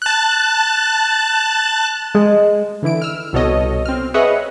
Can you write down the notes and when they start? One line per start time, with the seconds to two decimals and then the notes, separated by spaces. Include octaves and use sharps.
0.02 A5 F#6
2.15 G#3
2.82 D3 E3 E4 D7
3.02 E6 F6
3.33 C2 B2 A4 C#5 D#5
3.86 C4 F6
4.14 G#4 B4 C#5 D#5 E5 F#5